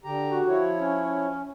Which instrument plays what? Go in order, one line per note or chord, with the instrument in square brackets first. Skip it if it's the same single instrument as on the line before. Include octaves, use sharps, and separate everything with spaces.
[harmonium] D3 G4 A#5
[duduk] F#4
[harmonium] F3 E4 C#5
[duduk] C#4